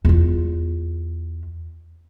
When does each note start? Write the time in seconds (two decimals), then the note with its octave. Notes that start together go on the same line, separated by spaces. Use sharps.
0.05 E2 F4